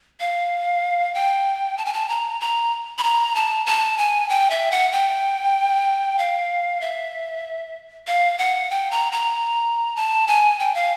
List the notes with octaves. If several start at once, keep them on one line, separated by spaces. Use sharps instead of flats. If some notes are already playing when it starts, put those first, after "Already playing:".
F5
G5
A5
G#5
A5
A#5
A#5
B5
A#5
A5
A5
G#5
G5
E5
F#5
G5
F5
E5
F5
F#5
G5
A#5
A#5
A5
G#5
G5
F5